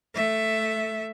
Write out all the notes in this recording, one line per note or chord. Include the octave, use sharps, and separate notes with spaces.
A3 E5